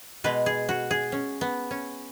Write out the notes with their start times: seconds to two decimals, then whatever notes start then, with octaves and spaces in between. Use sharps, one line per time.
0.24 B2 G#3 B4
0.46 G#4
0.69 F#4
0.91 G#4
1.12 C#4
1.41 B3
1.71 C#4